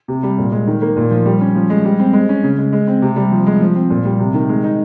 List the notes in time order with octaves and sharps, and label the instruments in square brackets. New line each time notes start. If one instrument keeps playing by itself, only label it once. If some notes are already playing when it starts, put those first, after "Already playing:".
[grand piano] C3
G3
A#2
G#3
D#3
A#3
A#2
F3
G3
C#4
F3
G#3
G3
C4
G#3
C#4
C#3
G#3
G#3
C4
C3
G3
F3
G#3
F3
C4
A#2
G3
C3
D#3
G#3
D#4